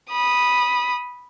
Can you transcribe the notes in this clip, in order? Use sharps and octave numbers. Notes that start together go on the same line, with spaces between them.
B5 D#6